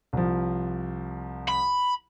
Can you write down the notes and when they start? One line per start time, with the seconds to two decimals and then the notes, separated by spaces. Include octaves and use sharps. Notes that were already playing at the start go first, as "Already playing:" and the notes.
0.13 C2 F3
1.48 B5